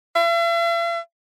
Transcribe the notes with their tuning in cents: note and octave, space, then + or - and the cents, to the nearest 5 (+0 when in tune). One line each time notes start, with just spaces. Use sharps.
E5 +45